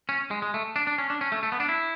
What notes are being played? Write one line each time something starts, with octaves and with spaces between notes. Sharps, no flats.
C#4
G#3
G#3
A3
D4
D4
C#4
D4
C#4
A3
A3
B3
D4
E4